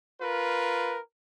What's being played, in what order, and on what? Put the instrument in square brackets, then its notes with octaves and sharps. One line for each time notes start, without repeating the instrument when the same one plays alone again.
[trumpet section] F4 A#4 B4